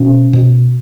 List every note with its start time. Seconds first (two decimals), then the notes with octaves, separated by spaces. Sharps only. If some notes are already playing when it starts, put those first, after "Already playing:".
Already playing: B2 C#4
0.33 B2